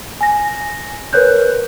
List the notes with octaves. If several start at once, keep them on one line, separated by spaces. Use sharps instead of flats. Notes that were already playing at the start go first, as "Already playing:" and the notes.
G#5 A#6
A#4 B4 C#5 F#6 G6